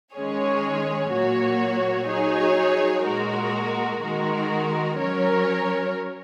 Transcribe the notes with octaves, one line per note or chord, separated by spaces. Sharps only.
D#3 G#3 C#4 G#4 C#5
A#2 F#3 A#3 F#4 C#5
F#3 D#4 G#4 C#5
A#2 G#3 F#4 A#4
D#3 G#3 F#4 A#4
F#3 C#4 A#4 C#5